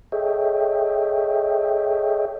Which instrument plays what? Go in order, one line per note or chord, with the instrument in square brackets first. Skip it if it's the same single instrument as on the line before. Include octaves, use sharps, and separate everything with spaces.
[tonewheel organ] G#4 A4 C#5 D#5 E5 G5